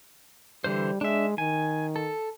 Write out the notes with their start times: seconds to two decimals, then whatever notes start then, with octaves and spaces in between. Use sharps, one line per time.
0.64 D3 E3 G3 C5
1.01 G#3 D4 E5
1.38 D#3 G#5
1.96 A4